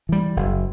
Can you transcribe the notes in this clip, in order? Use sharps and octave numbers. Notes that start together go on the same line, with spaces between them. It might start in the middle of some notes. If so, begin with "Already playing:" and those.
E3 G3
F#1